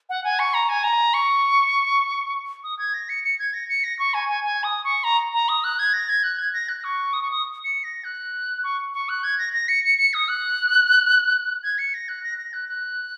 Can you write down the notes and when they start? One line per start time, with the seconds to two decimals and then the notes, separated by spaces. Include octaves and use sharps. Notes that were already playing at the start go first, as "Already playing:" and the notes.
0.09 F#5
0.24 G#5
0.39 C#6
0.54 A#5
0.69 G#5
0.84 A#5
1.14 C#6
2.64 D#6
2.79 G#6
2.94 A#6
3.09 C#7
3.24 C#7
3.39 G#6
3.54 A#6
3.69 C#7
3.84 A#6
3.99 C#6
4.14 G#5
4.29 G#5
4.44 G#5
4.64 D#6
4.84 C#6
5.04 A#5
5.34 A#5
5.49 D#6
5.64 F#6
5.79 G#6
5.93 A#6
6.09 G#6
6.23 F#6
6.39 G#6
6.53 A#6
6.69 F#6
6.84 C#6
7.13 D#6
7.22 C#6
7.31 D#6
7.64 C#7
7.84 A#6
8.04 F#6
8.64 C#6
8.94 C#6
9.09 F#6
9.24 G#6
9.39 A#6
9.53 A#6
9.68 C#7
9.84 C#7
9.98 C#7
10.14 D#6
10.28 F#6
11.63 G#6
11.78 C#7
11.94 A#6
12.08 F#6
12.23 A#6
12.38 A#6
12.53 F#6
12.69 F#6